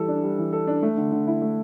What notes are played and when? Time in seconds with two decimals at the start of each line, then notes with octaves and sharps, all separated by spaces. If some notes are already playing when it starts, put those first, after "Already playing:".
Already playing: E3 G3 A4
0.08 D4
0.23 G3
0.38 E3
0.53 A4
0.67 D4
0.83 A3
0.97 D3
1.11 D3
1.27 E4
1.42 A3